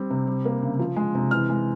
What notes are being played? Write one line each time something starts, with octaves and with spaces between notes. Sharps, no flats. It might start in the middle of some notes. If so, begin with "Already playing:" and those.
Already playing: G3 C4
C3
G3
A#3
C#3
F3
G#3
C3
E3 F6
G#3